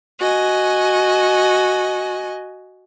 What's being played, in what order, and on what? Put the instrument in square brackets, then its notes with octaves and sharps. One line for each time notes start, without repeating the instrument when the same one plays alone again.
[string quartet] F#4 D#5 G#5